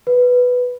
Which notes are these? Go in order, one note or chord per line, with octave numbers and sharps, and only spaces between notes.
B4